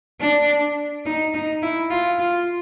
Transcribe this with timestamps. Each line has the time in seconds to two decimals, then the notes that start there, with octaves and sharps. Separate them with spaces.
0.21 D4
1.06 D#4
1.34 D#4
1.63 E4
1.91 F4
2.19 F4